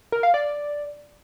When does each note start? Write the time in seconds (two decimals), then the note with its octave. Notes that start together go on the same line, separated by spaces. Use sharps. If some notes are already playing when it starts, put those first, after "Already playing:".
0.12 A#4
0.23 F5
0.34 D5